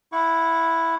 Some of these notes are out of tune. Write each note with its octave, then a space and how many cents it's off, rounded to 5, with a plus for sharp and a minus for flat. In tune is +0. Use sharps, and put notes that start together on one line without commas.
E4 +0 F#5 -30 C#6 +20